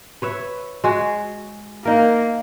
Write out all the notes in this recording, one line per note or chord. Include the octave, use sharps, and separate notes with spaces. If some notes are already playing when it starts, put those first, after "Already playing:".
B4 C#5 E5
G#3 F#4 G#4
A#3 D#4 A#4